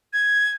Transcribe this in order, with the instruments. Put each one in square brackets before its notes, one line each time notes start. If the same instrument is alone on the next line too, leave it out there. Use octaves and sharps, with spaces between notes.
[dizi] G#6